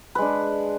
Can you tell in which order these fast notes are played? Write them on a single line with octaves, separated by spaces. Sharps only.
B4 G#3 D4